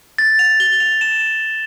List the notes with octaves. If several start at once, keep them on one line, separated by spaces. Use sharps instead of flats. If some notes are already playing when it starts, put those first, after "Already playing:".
A6
F7
G7
F7
E7